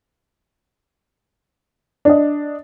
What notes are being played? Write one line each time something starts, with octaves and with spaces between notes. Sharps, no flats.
D4 D#5